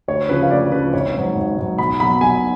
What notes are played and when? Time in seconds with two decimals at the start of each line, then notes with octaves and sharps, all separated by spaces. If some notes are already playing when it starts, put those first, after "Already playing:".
0.08 D2 C#5
0.29 C#3 F3 B4
0.43 F5
0.51 D2 D5
0.72 C#3 F3 B4
0.94 G#1 C#5
1.15 G#2 F#3
1.36 G#1
1.58 G#2 F#3
1.78 B1 B5
2.00 B2 F#3 B5
2.21 B1 G#5